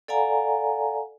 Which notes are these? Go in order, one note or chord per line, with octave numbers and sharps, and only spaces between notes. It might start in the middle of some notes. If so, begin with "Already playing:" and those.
A4 D5 F5 F#5 G#5 A#5